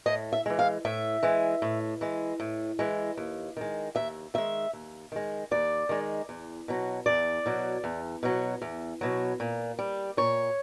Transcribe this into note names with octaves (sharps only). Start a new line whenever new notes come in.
A2 D#5
E5
E3 G#3
F5
A2 E5
E3 G#3
A2
E3 G#3
A2
E3 G#3
D#2
D#3 G#3
D#2 E5
D#3 G#3 E5
D#2
D#3 G#3
D#2 D5
D#3 G#3
E2
B2 F#3
E2 D5
B2 F#3
E2
B2 F#3
E2
B2 F#3
A#2
G3
A#2 C#5